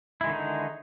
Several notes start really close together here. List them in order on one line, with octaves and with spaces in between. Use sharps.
E4 G#3 D#3 D3 D#4